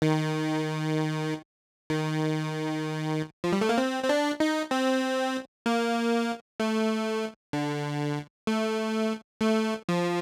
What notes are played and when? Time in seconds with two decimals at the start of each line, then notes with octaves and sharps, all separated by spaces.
0.02 D#3
1.90 D#3
3.44 F3
3.52 G3
3.61 A3
3.69 A#3
3.78 C4
4.04 C4
4.09 D4
4.40 D#4
4.71 C4
5.66 A#3
6.60 A3
7.53 D3
8.47 A3
9.41 A3
9.89 F3